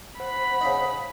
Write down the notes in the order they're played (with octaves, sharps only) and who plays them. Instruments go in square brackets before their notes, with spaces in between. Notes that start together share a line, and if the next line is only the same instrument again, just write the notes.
[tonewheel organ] C5 F#5 [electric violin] B5
[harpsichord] C#3 D#4